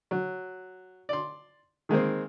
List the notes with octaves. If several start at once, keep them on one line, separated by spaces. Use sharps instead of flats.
F#3
D5 C6
D#3 G#3 A#3 C4